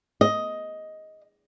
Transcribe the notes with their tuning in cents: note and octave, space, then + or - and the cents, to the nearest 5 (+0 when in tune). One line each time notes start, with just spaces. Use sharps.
D#5 +10